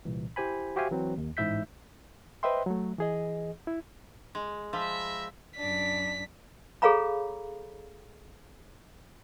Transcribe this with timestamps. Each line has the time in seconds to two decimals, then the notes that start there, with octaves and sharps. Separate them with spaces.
0.05 C2 A#2 E3
0.36 E4 G4 C5 G#5 B5
0.76 F#4 G4 C5 E5 F5 G#5
0.91 E3 F#3 C4
1.18 D#2
1.37 A1 G#2 E4 E5 G6 B6
2.43 B4 C5 D#5 E5 G5 C6
2.66 F#3 A3
2.98 E3 G#4 D#5
3.67 E4
4.35 G#3
4.73 F3 E5 A#5 B5
5.57 F#2 D4 B6
6.82 G#4 A4 C#5 F5 A#5 B5